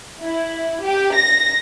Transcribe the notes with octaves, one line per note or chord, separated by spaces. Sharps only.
E4
G4
A#6